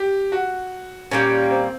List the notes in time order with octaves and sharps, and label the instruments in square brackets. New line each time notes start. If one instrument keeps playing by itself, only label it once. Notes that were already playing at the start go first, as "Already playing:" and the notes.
Already playing: [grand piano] G4
F#4
[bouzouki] A#2 G3 A#3 [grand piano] C#4
[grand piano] C4